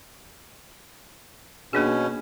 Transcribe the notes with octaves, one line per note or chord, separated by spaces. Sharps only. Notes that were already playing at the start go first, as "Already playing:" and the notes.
B2 A#3 C#4 D4 G#4